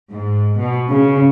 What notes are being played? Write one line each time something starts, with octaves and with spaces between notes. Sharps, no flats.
G#2
B2
C#3